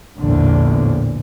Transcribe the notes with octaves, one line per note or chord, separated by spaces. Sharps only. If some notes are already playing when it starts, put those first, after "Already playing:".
A#1 E2 A2 D3 G3